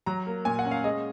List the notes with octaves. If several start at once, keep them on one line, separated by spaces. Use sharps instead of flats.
F#3 A#5
A#3
A#2 G#5
F#5
C#4
F5
G#3 D#5